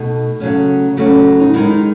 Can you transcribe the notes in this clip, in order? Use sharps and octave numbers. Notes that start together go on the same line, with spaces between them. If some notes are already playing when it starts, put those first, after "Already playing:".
Already playing: B2 A3 D#4
C#3 F#3 A3 C#4
C#3 F#3 A3 C#4
D#4
D#3 G#3 B3 D#4 E4